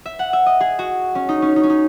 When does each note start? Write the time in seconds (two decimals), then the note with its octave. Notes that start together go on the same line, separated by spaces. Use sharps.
0.05 E5
0.19 F#5
0.33 E5
0.46 D#5
0.61 G#4
0.79 F#4
1.15 C#4
1.29 D#4
1.42 C#4
1.56 D#4
1.63 C#4
1.70 D#4